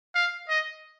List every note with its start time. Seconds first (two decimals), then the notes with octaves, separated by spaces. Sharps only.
0.15 F5
0.49 D#5